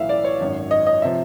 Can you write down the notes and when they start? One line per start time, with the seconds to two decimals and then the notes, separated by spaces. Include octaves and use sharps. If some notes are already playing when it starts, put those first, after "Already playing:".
Already playing: B1 A2 E3 E5 F5
0.09 D5
0.24 C#5
0.40 G#1 F#2 D#3
0.71 D#5
0.87 D#5
1.02 C3 F3 E5